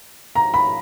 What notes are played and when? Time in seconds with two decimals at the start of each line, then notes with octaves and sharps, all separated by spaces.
0.35 A#5
0.54 B5